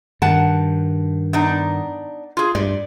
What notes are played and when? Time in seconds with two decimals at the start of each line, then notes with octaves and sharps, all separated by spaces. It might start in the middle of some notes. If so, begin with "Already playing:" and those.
0.22 G2 D#3 F#5 A5
1.33 B3 D4 D#4
2.37 F4 G#4
2.55 G2 D5